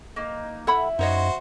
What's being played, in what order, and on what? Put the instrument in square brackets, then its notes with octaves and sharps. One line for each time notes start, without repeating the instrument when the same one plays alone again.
[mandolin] A#3 D#4
[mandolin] E4 [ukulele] A4 F#5 B5
[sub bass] F#2 [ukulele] D#4 C#5 D#5 [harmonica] F#4 C5